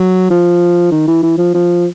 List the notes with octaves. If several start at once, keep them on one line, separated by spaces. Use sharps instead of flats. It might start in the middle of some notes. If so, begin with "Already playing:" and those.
Already playing: F#3
F3
D#3
E3
E3
F3
F3